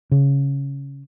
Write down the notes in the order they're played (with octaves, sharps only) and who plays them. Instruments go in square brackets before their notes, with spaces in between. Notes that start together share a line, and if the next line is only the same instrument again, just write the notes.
[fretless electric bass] C#3